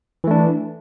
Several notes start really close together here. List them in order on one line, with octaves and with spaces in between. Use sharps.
E3 A3 D4